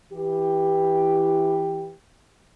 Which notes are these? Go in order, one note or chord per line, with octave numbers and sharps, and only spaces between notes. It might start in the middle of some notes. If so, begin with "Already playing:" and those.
E3 G4